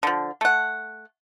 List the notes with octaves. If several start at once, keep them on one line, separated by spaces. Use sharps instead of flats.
D3 F3
A3 F#5